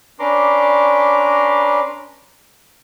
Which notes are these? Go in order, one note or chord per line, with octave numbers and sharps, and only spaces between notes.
C#4 D4 B4 A#5 C6 D6